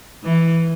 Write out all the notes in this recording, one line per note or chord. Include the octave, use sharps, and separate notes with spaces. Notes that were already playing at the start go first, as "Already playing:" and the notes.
E3